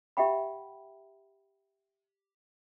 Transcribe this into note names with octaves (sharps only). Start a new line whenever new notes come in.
G4 E5 F#5 G5 B5